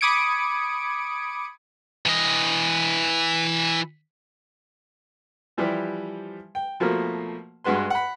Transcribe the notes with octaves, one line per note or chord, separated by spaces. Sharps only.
B5 D6 D#6 G#6 C#7 D7
E3 D#5
E3 F3 G3 E4 G4 B4
G5
B2 F3 A3 A#3
G2 G#3 F#4 B4 C6
F#5 B5